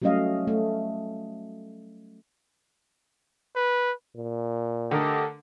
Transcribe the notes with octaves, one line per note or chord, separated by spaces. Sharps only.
F#3 G3 A3 C#4 D#5 F5
A3
B4
A#2
D3 A3 G4 A4 A#4 D#5